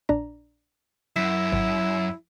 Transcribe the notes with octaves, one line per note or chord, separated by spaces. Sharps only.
A#1 D4 A#5
F#2 E4 B6
G#1